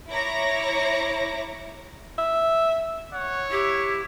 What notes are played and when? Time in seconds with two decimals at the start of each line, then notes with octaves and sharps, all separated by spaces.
0.10 E4 C#5 A#5 D6 A#6
2.18 E5
3.13 C#5 F#5
3.51 E4 G4